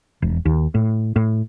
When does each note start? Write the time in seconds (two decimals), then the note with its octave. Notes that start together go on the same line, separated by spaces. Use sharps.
0.22 E1
0.45 D#2
0.75 A2
1.16 A2